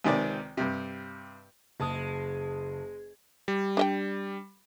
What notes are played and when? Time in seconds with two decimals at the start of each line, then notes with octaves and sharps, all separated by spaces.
0.04 C#2 C3 D#3 C4 D5
0.57 G2 C3
1.80 F#1 G#3 A5 D#6
3.48 G3
3.77 D4 D#5 G5